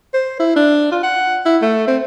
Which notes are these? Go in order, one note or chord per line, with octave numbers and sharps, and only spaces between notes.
C5
E4
D4
F4
F#5
E4
A3
C4